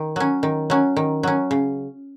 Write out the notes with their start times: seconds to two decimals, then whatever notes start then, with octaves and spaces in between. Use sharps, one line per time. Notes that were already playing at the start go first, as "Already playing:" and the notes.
Already playing: D#3
0.16 F#3 C#4
0.43 D#3
0.70 F#3 C#4
0.96 D#3
1.23 F#3 C#4
1.51 C#3